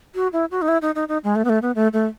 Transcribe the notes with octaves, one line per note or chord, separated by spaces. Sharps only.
F#4
E4
F#4
D#4
E4
D#4
D#4
D#4
G#3
A3
B3
A3
B3
A3
A3